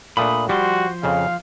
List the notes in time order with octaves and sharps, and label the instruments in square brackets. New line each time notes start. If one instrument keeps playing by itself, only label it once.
[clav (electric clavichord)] A#2 A3 D4 [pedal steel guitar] B5 D#6
[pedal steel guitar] F3 C5 C6 [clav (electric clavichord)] G3 [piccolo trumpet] F#4
[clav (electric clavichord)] F2 C#3 [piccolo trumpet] F5